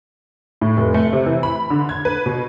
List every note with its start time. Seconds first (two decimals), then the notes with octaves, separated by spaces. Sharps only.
0.61 A2
0.77 F1
0.94 A3
1.13 C3
1.26 E3
1.43 B5
1.70 D3
1.89 G#6
2.05 B4
2.26 B2